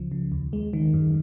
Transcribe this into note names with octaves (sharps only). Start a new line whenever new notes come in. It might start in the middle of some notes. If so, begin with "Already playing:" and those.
Already playing: C#2 C#3 F3
C#3
D#2
G#3
D#3
F#2